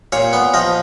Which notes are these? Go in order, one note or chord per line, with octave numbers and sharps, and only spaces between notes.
A#2 C#5
B3
F3 D#5